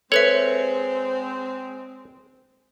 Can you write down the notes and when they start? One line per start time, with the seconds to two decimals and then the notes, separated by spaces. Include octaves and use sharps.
0.12 G#3 C4 A4 B4 C#5 E5